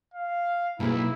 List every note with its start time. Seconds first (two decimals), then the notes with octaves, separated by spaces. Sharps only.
0.14 F5
0.80 B1 A#3 E4 G#4 B4